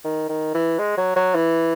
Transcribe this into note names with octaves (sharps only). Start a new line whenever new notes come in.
D#3
D#3
E3
G#3
F#3
F#3
E3